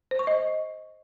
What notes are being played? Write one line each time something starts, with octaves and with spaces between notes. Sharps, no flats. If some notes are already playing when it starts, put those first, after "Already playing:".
C5
C#6
D#5